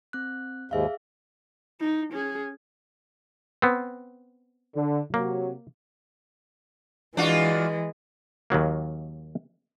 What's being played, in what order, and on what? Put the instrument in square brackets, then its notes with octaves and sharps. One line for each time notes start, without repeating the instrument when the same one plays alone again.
[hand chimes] C4 F#6
[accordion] D#2 G#2 [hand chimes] G#4 E5 F5
[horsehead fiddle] D#4
C#4 G#4
[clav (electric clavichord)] B3 C4
[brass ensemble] D3
[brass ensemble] C3 F#3 [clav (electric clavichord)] A#3
[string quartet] E3 G#3 [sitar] D4 F4 F#4
[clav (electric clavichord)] D#2 D#3 F#3 A#3